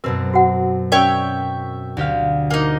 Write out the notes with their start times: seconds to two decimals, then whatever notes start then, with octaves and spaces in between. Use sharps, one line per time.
0.04 F#2 B2 C4 A#4 B4
0.34 F#4 F#5
0.92 C#4 A#4 C#5 D5 E5 G5
1.97 D2 G4 F5
2.50 A#3 D#4